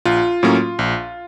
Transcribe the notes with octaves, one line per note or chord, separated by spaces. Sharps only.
A#1 F4
A2 F#3 A#3 C#4
A#1